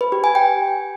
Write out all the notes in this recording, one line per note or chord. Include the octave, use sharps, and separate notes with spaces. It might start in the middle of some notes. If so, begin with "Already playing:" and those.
B4
G4
G#5
G5